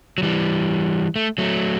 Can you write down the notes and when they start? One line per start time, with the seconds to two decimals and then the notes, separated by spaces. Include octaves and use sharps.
0.18 F#3
0.23 E3 G3
1.16 A3
1.38 F#3 A3